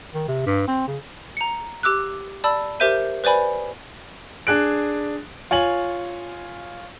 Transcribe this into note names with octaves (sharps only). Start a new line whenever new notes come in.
D#3
C3
G2
C4
C#3
A#5 C#7
G4 D6 E6 F#6
D5 A5 B5 E6
G4 A#4 C5 E5 G6 D#7
B4 C5 D5 G#5 B5
D4 G#4 F#6 D7
F4 C#5 G#5 F#7